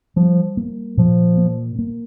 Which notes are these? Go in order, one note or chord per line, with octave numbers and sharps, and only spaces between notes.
F3 G3
A#3
A#2 F3
A#3
A#3